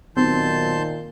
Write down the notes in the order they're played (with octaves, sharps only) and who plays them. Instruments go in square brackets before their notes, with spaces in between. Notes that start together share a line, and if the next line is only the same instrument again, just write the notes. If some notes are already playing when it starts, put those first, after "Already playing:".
[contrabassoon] B1 [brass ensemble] A#2 D#3 [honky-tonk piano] C4 [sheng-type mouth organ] A5 C6 G6